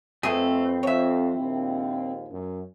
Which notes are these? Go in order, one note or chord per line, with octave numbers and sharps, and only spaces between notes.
F2 A3 C4 G#4 B4
F2 F3 C#5 E5
A#1 D#2 E4
F#2